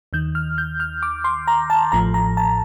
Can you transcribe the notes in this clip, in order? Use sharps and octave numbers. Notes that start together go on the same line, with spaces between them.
D#2 D#3 G6
F6
G6
F6
D6
C6
A#5
A5
A1 A2 F3 A#5
A#5
A5